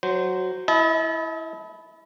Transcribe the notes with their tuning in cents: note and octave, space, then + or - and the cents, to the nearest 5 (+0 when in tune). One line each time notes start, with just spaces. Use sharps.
F#3 +0 C5 -10
E4 +0 D#5 +45 A5 -25